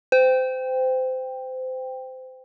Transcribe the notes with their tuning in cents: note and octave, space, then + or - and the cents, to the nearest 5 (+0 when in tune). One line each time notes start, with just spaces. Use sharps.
C5 -25 G5 +10